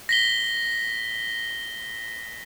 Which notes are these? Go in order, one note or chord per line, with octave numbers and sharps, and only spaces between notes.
A#6 B6 G7